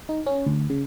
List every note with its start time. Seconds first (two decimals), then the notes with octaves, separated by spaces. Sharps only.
0.09 D#4
0.27 C#4
0.46 D2
0.70 C#3